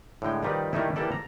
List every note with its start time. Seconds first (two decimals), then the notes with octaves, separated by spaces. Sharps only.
0.22 A2 D3 G#3 G5
0.43 D#3 F3 G3 D#4 B4
0.73 D#3 G3 A3 D#4 E4
0.96 E3 G3 A#3 A4 D5
1.12 A#5